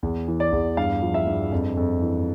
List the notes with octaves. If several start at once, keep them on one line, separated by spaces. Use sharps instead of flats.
E2
E3
D5
E2
G2 F5
F3
E5
G2
F2
F2
E3